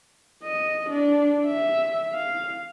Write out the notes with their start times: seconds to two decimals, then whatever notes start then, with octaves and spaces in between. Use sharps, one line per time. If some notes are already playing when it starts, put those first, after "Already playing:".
0.43 D#5
0.90 D4
1.46 E5
2.14 F5